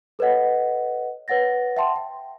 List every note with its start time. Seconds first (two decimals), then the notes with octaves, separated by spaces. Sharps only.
0.19 A4 B4 C#5 D#5 F#5
1.28 B4 C#5 F#5 A6 A#6
1.77 E5 F#5 G5 A5 C6
1.96 G5